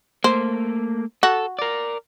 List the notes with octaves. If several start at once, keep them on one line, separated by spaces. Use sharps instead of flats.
A3 A#3 C5
F#4 A4
A#4 D5